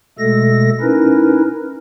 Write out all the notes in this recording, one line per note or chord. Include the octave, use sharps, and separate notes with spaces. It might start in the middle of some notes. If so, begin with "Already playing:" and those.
B2 G#3 A3 A4 A#6
C#4 D#4 E4 A#4 B4